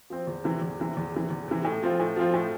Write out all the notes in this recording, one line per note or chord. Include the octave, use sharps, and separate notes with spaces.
F3 C4
E2
C3 E3
E2
C3 E3
E2
C3 E3
E2
C3 E3
A2
F3 C4 F4
A2
F3 C4 F4
A2